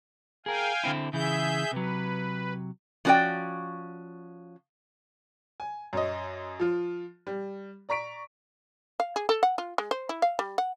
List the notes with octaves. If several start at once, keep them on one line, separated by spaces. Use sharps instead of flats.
G#4 A#4 F5 G5 G#5
D3 C4 E4
C#3 E3 G#4 E5 G6
C3 F#3 B4
F3 C#4 F#4 A#4 D5 G5
G#5
F#2 C#5 D#5
F3 F4
G3
D5 A#5 C#6 B6 D7
F5
G#4
A4
F#5
F4
G#3
C5
E4
F5
G3
F#5